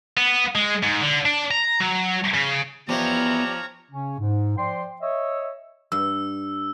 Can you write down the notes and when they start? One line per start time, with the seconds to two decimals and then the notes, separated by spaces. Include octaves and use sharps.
0.17 B3
0.55 G#3
0.83 G#2
1.02 D3
1.26 D4
1.51 A#5
1.80 F#3
2.34 C#3
2.89 F3 B3 G4 C#5 D5 E5 A#5
3.91 C#3 C#4
4.20 G#2
4.58 F3 C5 D5 G5 C6
5.02 C#5 D#5 E5
5.92 G2 E6